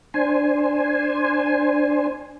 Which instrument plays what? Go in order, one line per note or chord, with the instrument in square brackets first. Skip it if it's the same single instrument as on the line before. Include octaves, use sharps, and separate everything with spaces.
[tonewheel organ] D4 C5 G#5